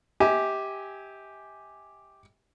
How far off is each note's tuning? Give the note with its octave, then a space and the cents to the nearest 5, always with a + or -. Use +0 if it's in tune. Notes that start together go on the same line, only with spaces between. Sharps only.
G4 +0 E5 -45 G#5 +0